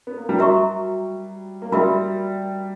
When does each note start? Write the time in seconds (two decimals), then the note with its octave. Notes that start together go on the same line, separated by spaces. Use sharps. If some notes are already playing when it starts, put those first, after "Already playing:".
0.07 B3
0.17 A#3
0.29 G3
0.39 F#3 F#4 A#4 E5 A#5 C#6
1.62 A#3
1.72 G3 F#4 A#4 E5 B5